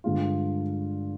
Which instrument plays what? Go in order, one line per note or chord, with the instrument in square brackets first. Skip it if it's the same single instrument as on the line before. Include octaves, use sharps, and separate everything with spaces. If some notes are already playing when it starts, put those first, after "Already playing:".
[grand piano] G2 D3 G#3 D4 F4